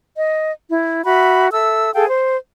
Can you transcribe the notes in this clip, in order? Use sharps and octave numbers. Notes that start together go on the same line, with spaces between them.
D#5
E4
F#4 E5 B5
A4 E5 E6
G#4 A4 F5 G5
C5